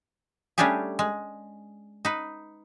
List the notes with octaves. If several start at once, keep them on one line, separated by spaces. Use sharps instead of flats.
G3 A3 C#4 D4 G4 G#4
G#3
D#4 B4